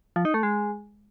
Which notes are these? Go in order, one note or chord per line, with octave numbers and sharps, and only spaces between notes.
F3
D#4
A3
G#3